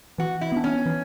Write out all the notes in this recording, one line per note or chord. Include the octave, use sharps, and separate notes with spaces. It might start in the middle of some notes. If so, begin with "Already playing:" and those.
E3 F#4
E4
B3 D4
C#4
E3